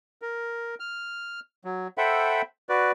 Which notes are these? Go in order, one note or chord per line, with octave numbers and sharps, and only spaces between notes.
A#4
F6
F#3
A4 C5 E5 F#5 G5 B5
F#4 B4 D5